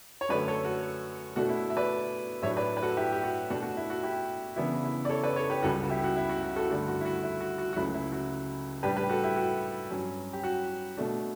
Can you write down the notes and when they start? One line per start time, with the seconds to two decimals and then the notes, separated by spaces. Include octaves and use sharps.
0.21 C#5
0.29 F#2 D3 A3 B4 D5
0.48 A4 C#5
0.65 F#4 A4
1.36 B2 A3 D4 F#4
1.49 E4
1.70 E5
1.77 B4 D5
2.42 A2 F#3 A3 D4 C#5 E5
2.57 B4 D5
2.77 B4
2.83 F#4 A4
2.97 E4 G4
3.12 G4
3.24 F#4
3.50 B2 A3 D4 F#4
3.63 F#4
3.77 E4
3.90 F#4
4.03 E4 G4
4.56 C#3 E3 B3 D4 E4
4.84 E4
5.05 D5
5.09 A4 C#5
5.24 B4 D5
5.36 A4 C#5
5.50 G4 B4
5.63 C#2 C#3 G3 F#4 A4
5.83 F#4
5.89 E4 G4
6.04 F#4
6.17 E4
6.29 F#4
6.43 F#4
6.56 F#4 A4
6.70 G2 D3 A3 D4
6.88 F#4
7.01 E4
7.05 F#4
7.23 E4
7.41 F#4
7.58 F#4
7.73 F#4
7.76 C#2 C#3 F#3 A3 E4
7.94 E4
8.12 F#4
8.83 A2 G3 D4 G4 B4
8.97 G4 B4
9.10 F#4 A4
9.24 E4 G4
9.36 F#4
9.90 G2 F#3 C#4
10.33 G4
10.44 F#4
10.97 B2 A3 D4